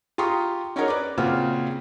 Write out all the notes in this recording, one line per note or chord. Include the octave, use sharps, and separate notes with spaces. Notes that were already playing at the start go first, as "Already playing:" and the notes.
F4 G4 A#5 C6 C#6 D#6
C#4 D#4 F#4 G#4 A#4 C#5
B4 D5 D6
A#2 C#3 C4 F4 F#4